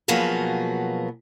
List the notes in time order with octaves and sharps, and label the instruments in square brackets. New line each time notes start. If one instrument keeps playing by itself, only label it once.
[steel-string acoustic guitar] B2 F3 F#3 A#3 B3 G#4